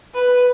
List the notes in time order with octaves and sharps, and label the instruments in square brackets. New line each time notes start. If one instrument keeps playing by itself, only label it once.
[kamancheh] B4